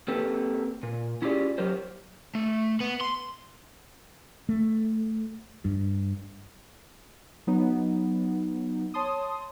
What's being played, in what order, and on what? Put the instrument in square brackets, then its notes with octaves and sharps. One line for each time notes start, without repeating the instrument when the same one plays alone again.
[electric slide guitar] A#3 C4 G4 A4 B4
A#2
C#4 E4 F4 G4 G#4 D5
F#3 G4 A#4 C5
[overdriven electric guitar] A3
B3
C6
[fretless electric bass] A3
G2
[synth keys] F#3 B3 D#4
C#5 A5 C6 D#6